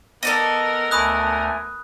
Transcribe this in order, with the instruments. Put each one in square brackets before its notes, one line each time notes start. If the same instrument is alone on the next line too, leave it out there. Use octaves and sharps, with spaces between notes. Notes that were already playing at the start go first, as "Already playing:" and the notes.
[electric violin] B3 A#4 [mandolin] A4 D5 D#5
[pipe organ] D2 A3 G#5 [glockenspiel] B5 D#6 F#6